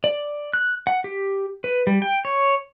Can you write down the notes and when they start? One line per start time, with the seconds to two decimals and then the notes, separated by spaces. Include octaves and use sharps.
0.04 D5
0.53 F#6
0.87 F#5
1.04 G4
1.64 B4
1.87 G3
2.02 G5
2.25 C#5